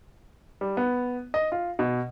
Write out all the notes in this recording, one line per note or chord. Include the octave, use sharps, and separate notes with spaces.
G3
B3
D#5
F4
B2